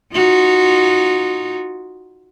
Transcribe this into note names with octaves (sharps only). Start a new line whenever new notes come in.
D#4 F4 F#4